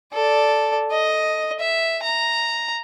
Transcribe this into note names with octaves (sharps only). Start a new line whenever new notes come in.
A4 D5
D#5
E5
A#5